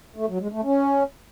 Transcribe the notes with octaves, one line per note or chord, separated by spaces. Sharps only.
A3
F#3
G#3
A3
C#4